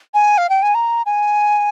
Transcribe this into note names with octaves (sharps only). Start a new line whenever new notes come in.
G#5
F5
G5
G#5
A#5
G#5